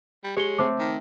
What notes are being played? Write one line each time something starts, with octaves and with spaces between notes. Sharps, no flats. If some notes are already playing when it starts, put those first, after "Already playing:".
G3
G#3 G4 C#5 C#7 G7
A3 C4 C5 A5 D6
D#3